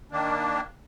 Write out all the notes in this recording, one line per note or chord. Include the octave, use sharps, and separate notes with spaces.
D#3 A#3 D4